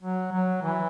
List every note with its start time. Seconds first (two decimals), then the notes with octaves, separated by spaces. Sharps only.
0.01 F#3
0.32 F#3
0.62 E3